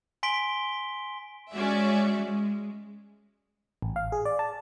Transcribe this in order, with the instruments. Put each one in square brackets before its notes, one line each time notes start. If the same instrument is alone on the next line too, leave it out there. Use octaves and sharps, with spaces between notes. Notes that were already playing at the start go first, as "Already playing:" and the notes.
[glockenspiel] G#5 C6 B6 D7 G7
[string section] G#3 C#4 F#4 D5 E5
G#3
[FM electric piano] A1
F5
G#4
D5
A5